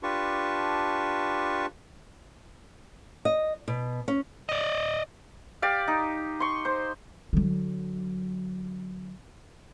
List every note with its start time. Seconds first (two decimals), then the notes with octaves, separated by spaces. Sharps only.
0.03 D4 F4 G4 B4 A5 C#6
3.25 D#5
3.68 B2
4.08 C#4
4.49 D5 D#5
5.62 G4 D5 F5
5.88 D#4
6.40 C6 C#6
6.65 C5
7.33 D3 F#3